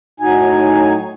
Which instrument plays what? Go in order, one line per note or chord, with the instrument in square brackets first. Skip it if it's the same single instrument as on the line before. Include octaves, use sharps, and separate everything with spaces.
[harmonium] A2 F#3 D#4 G#5